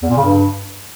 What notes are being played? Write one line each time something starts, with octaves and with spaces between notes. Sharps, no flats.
E2
A#2
C#3
G2